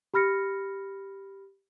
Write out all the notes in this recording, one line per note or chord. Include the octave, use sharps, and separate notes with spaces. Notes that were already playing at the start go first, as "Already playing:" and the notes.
G4 B5 F6 A#6 C#7